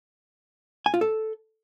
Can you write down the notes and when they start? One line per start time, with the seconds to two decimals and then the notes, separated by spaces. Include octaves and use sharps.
0.86 G#5
0.94 F4
1.01 A4